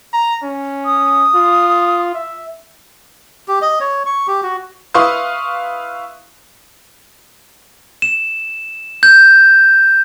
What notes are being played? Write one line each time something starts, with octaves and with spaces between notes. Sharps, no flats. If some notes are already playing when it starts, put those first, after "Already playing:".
A#5
C#4
D#6
F4
E5
G4
D#5
C#5
C#6
G4
F#4
E4 B4 F5 C6 C#6 D#6
E7
G6